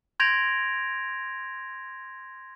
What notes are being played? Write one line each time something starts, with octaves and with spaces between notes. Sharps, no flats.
C6 G6 G#6 A#6 D7 F7